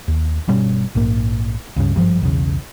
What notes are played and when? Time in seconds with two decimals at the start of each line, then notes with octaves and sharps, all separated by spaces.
0.08 D#2
0.48 G1 B2 G3 C#4
0.95 A#1 G#2 A#3
1.76 C#2 G2 C#3
1.95 G#1 G2 C3 F3
2.21 B1 E2 C#3